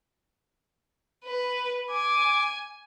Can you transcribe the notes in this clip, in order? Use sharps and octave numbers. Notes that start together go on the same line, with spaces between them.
B4
G#5 D6